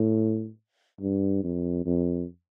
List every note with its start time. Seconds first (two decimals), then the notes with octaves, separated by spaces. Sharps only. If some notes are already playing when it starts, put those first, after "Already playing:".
Already playing: A2
1.01 G2
1.44 F2
1.86 F2